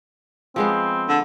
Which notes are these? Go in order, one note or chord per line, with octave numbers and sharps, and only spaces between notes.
F3 G#3 B3 C4
D3